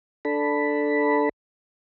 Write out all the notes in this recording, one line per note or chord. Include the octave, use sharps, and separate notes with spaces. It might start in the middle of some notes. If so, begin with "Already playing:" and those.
D4 A4 B5